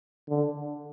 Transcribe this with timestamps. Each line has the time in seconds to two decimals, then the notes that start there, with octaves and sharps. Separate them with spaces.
0.29 D3